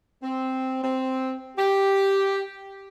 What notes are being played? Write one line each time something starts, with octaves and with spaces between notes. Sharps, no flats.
C4
C4
G4